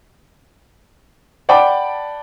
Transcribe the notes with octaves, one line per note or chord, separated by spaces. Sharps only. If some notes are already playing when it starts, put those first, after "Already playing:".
D5 F#5 G5 A5 B5 D6